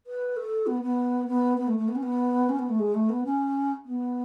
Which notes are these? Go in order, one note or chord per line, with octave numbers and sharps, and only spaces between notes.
B4
A4
B3
B3
B3
B3
A3
A3
B3
C#4
B3
C#4
B3
A3
G#3
A3
B3
C#4
B3